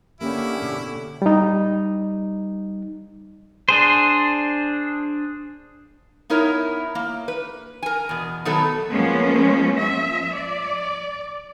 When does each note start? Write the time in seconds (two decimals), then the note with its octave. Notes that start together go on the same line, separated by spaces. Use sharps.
0.21 D3 A#3 C#4 E4 G4
0.62 B2
1.22 G3 D#4
3.69 D4 G#4 C5
6.30 B3 D#4 E4 A#4 C#5
6.95 A#3
7.28 B4
7.83 A#4 G#5
8.09 E2 B2
8.45 B2 D#3 F#3 A3 B3 A4
8.92 F3 G#3 A#3 B3 C#4
9.76 F3 E5
10.33 D5